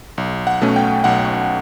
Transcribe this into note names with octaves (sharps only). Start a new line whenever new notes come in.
B1
F#5
B2 A3 C#4
G5
B1 F#5